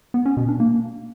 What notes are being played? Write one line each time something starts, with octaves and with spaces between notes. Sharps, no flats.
B3
C#4
B2
D4
A#3